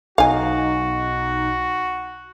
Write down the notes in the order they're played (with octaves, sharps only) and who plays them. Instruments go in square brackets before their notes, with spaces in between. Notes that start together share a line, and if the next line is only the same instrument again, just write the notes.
[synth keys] B1 D#4 [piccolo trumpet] F#4 [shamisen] F5 G#5